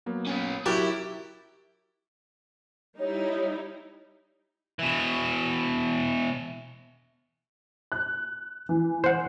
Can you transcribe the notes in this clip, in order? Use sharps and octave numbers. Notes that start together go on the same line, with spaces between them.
F#3 A#3 B3
C#4 B4
F#3 E4 F#4 G4 A#4 E5 A6
G3 D#4 E4 C#5
B2 E3
F#6
E3
C5 F#5